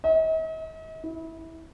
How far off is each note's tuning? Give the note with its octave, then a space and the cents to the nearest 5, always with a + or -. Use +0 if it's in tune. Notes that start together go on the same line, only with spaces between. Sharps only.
D#5 +45
E4 -20